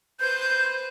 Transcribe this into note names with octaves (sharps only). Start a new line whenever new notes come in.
B4 C5 G6